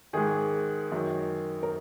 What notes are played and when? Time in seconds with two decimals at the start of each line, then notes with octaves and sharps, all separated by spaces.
0.13 G#2 D#3 G#4
0.92 F#2 D#3
1.63 A#4